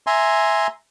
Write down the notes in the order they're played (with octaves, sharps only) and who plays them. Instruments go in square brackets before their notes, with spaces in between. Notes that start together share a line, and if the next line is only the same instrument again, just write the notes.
[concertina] E5 G#5 A#5 C6